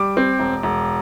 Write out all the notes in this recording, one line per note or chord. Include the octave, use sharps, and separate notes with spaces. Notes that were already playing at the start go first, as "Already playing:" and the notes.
Already playing: G3 D6
C4
E1
E1